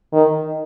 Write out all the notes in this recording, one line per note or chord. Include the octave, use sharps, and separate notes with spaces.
D#3